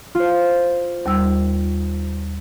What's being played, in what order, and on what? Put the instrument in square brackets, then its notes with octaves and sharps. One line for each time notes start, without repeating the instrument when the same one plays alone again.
[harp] F4 C5
[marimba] D#2 G3 E6